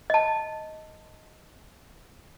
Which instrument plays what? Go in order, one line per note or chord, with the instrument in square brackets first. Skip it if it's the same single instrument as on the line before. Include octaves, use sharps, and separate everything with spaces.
[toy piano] D#5 A5